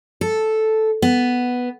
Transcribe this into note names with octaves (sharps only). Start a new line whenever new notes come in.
A4
B3